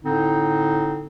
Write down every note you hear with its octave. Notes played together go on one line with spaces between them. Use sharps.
A2 D3 C4 D#4